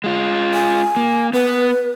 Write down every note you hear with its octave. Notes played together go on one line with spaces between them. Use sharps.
G#3 F4
G#5
A#3
B3 B4